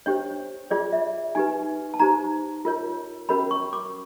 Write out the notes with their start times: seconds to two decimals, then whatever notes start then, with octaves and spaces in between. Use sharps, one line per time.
0.06 D4 G4 C5 C#5
0.71 F4 G#4 C#5 D5
0.93 E5
1.35 D#4 G4 B4 G#5
1.94 A5
1.99 D#4 G4 C5 A#5
2.65 F4 A#4 C#5
3.29 C#4 F#4 A#4 C#5 B5
3.51 C#6
3.73 D6